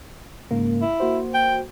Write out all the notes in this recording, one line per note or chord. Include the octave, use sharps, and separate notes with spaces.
G#2 C#3 A#3
E4
A#3 F#4 C5
G5